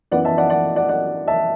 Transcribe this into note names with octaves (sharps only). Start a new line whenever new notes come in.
F#2 E3 B3 D5 F#5
E5 A5
D5 F#5
D5 F#5
D5 F#5
D5 F#5
E5 A5